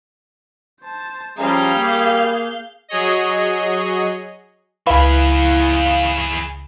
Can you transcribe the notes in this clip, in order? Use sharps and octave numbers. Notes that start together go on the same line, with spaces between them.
C5 A5
F3 G3 C#4 G#4 F5 A#5 G6
A#3
F#3 G#4 C#5 D#5
C#2 E3 E4 G#4 B4 F5 B5